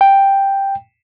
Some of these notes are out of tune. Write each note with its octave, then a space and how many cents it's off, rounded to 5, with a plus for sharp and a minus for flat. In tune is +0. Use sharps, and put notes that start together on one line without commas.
G5 +5